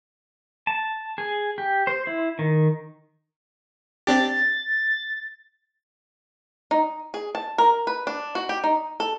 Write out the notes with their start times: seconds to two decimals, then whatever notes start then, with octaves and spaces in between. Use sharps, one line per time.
0.67 A5
1.18 G#4
1.58 G4
1.87 C5
2.07 E4
2.39 D#3
4.07 C4 D4 G4 A6
6.71 D#4
7.14 G#4
7.35 A5
7.58 A#4
7.87 B4
8.07 D4
8.35 F#4
8.49 G4
8.64 D#4
9.00 A4